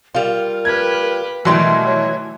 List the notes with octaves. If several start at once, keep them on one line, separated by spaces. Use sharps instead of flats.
G3 F4 A#4
G4 B4 G#6
B2 D#3 E3 F#3 G3 A3 C6
C#5